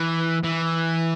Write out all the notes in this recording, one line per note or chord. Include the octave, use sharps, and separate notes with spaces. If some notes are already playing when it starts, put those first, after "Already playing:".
Already playing: E3
E3